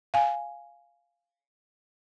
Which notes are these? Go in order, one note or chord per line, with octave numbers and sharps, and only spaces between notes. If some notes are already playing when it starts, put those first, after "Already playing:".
F5 G#5